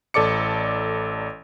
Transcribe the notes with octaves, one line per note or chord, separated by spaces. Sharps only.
A1 A4 D5 D6 C#7